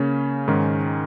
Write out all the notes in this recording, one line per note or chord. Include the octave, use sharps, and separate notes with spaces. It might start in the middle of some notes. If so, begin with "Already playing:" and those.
Already playing: C#3 A#3 C#4
G#2 D#3 G#3 C#4